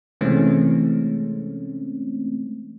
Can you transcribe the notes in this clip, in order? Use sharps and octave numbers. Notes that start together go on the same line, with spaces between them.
C3 E3 G#3 A3 C4 C#4